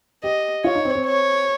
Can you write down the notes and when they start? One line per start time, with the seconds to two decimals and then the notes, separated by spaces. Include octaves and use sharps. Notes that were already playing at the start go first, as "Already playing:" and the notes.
0.23 G4 D#5
0.64 F4 C#5
0.75 D#4
0.85 C4
0.95 C4
1.06 C#5